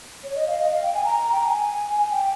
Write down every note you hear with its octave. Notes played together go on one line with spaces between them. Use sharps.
C#5
D#5
F5
D#5
F5
G5
G#5
A#5
G5
A#5
G#5
G5